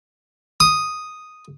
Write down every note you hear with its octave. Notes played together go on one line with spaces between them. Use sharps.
D#6